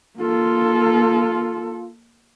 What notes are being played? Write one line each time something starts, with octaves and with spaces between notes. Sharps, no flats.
A#3 F4 A4